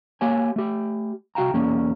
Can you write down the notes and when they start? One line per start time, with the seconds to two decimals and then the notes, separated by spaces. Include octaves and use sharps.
0.21 A#3 G4 C#5 G#5
0.56 A3 G4
1.35 C2 F#4 F5 G5 A#5
1.53 E2 A#3 C#4